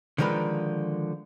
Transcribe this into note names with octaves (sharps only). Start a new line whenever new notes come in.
D3 D#3 F3 G#3 A#4 B4